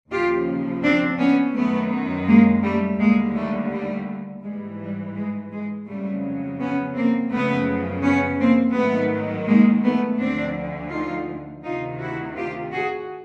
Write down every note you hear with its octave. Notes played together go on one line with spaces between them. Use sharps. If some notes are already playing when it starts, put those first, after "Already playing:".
D#2 C#3 F3 F4 G4
C4 D4
B3 C#4
F#2 D#3 F#3 A3 B3
G#3 A#3
G3 A3
D#2 D3 G3 G#3 A#3
G3 A3
G3 A3
G#2 E3 G3 G#3
G3
G#3
G#3
F2 C#3 F#3 G3 A3
B3 C#4
A#3 C4
F#2 C#3 F3 A3 B3
B3 C#4
A#3 C4
G#2 D#3 F#3 A3 B3
G#3 A#3
A3 B3
D2 D3 F3 C4 D4
D#4 F4
D2 C3 D#3 D#4 F4
E4 F#4
F4 G4
F#4 G#4